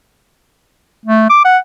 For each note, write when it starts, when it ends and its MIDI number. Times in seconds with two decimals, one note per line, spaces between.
1.05 1.28 57
1.30 1.41 86
1.45 1.58 78